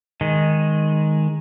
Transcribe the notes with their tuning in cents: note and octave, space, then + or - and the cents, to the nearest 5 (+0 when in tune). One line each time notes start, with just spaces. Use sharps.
D#3 +0 G#3 +0